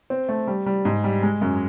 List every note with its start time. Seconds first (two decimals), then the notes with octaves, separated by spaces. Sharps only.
0.10 C4
0.29 A3
0.47 G3
0.66 G3
0.85 G#2
1.04 G3
1.23 G#3
1.41 F#2